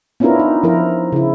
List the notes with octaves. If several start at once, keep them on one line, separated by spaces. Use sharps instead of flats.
B3 C#4 D4 E4 F4 A#4
D#4
F3 E4 A#4
C#3 E4